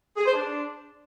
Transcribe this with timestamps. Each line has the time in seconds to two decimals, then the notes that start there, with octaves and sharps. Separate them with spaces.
0.17 G#4
0.25 C5
0.33 D4